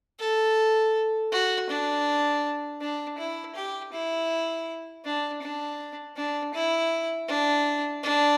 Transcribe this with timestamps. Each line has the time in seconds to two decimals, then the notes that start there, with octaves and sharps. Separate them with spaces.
0.19 A4
1.32 F#4
1.69 D4
2.81 D4
3.18 E4
3.56 G4
3.93 E4
5.05 D4
5.42 D4
6.16 D4
6.53 E4
7.28 D4
8.03 D4